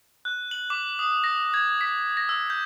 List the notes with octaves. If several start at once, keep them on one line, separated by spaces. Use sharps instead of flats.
F#6
F#7
D6
D#6
A#6
G#6
B6
A#6
E6
G6